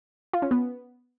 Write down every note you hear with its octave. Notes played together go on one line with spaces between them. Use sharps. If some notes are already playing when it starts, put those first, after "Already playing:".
F4
C#4
B3